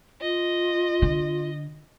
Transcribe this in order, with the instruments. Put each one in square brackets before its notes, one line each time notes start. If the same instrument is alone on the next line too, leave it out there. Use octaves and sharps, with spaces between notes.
[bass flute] F4 [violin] D#5
[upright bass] D3